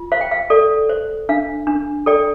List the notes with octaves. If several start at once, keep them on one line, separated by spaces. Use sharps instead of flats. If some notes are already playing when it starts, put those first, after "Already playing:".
Already playing: F4
C5 F5
G5
F5
A4 D5
C5
D4 F5
D4
A4 D5 G5